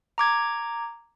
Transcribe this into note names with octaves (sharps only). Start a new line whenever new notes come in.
A#5 D6 G#6